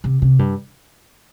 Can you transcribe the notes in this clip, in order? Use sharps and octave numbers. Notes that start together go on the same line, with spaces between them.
C3
C3
G2